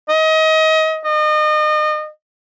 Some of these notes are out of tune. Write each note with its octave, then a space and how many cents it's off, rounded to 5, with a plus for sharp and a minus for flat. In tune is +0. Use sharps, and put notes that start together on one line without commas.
D#5 +30
D#5 -35